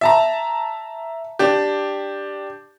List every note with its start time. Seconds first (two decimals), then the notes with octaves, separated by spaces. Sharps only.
0.01 E5 A5 A#5
1.39 D4 G4